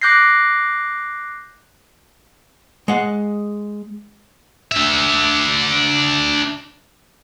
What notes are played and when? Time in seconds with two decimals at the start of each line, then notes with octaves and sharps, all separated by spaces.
0.02 D6 F#6 G6 A#6 C7
2.88 G#3 F#5
4.72 D4 E5